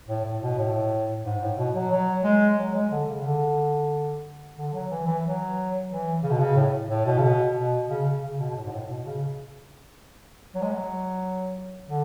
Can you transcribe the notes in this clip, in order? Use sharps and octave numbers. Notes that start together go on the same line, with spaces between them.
A2
A2
B2
A2
G#2
A2
B2
F#3
F#3
G#3
F#3
G#3
D3
C#3
D3
D3
F#3
E3
E3
F#3
E3
C#3
B2
C#3
A2
A2
B2
C#3
B2
B2
C#3
C#3
B2
B2
A2
G#2
A2
B2
C#3
F#3
G#3
F#3
D3